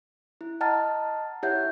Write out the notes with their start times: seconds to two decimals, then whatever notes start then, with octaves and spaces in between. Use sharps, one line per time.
0.41 E4
0.61 D#5 F#5 A5 A#5 F6 A6
1.43 E4 G4 C#5 E5 F#5 G6